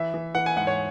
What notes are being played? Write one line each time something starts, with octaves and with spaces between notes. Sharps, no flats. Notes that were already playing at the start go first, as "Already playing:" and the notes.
Already playing: E3 E5
E3
E3 F#5
G#5
G#2 F#5
C#5